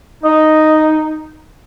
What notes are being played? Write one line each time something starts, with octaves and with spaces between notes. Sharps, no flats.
D#4 D#5